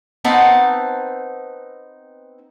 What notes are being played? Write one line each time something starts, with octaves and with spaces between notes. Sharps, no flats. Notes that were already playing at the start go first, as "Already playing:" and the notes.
B3 C4 D#4 A5